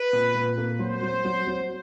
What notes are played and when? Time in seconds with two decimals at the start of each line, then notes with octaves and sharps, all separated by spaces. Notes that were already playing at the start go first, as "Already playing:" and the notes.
Already playing: B4
0.13 A#2
0.34 A#2
0.57 A#3
0.79 F#3 C5
1.03 F#3
1.25 F#3
1.47 F#3